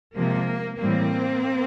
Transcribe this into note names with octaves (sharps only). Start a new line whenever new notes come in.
C3 F3 G#3 A#3
A2 E3 G3 A#3 C4